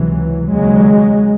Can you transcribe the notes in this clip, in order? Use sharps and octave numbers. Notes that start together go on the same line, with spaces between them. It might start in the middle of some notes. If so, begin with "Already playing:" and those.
Already playing: C#2 C3 E3 F#3
D#2 C#3 F#3 G#3